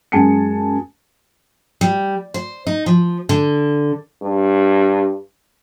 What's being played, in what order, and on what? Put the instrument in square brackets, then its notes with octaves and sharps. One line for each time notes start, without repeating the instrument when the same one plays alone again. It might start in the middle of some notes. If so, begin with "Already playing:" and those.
[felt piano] F#2 G#3 G#5 A5 C#7
[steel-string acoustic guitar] G3
C5
D#4
F3
D3
[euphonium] G2